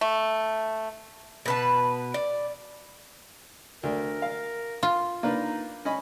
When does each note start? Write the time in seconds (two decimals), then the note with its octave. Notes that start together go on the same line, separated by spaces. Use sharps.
0.01 A3
1.46 B2 B4 A5
2.14 D5
3.83 D2 A#4
4.22 F5
4.83 F4
5.23 A#3 D4 D#4 B4
5.85 C#4 D#5 B5